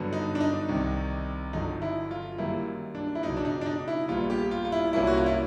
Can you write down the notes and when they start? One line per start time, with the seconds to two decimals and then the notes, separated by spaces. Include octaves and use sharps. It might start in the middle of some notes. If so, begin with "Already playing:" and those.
Already playing: G2 D3 F#3 B3
0.13 D#4
0.35 D4
0.41 D#4
0.69 C2 C3 D#3
1.53 G1 F#2 D3 F3 D#4
1.82 E4
2.11 F4
2.32 F4
2.38 F#2 D#3 G3 A#3 E4
2.95 D4
3.15 E4
3.23 C#2 B2 F#3 D#4
3.37 D4
3.45 D#4
3.61 D4
3.66 D#4
3.88 E4
4.08 A#1 A#2 G3 B3 F4
4.30 G4
4.51 F4
4.65 F4
4.72 E4
4.93 C2 A#2 F#3 A#3 C#4 E4
5.07 F#4
5.17 F4
5.26 E4